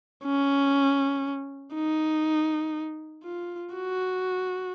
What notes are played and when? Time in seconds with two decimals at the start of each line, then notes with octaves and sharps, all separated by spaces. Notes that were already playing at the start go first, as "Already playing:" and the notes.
0.25 C#4
1.75 D#4
3.24 F4
3.75 F#4